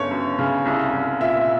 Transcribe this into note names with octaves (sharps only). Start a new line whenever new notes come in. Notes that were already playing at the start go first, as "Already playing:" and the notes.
Already playing: G1 C#3 C#5
F#2
C#3
C2
C2
A#2 E5